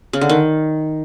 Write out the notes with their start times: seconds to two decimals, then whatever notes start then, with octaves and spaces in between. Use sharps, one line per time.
0.13 C#3
0.21 D3
0.29 D#3